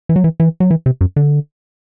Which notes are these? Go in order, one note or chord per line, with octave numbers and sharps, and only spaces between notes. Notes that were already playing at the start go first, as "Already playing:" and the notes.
E3
F#3
E3
E3
F#3
E3
C3
F#2
D3